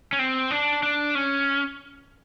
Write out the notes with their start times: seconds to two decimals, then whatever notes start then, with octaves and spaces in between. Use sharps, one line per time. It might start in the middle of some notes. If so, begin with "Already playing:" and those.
0.13 C#4
0.19 C4
0.51 D4
0.83 D4
1.15 C#4